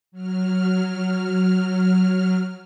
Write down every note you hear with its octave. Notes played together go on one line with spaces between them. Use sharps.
F#3 F6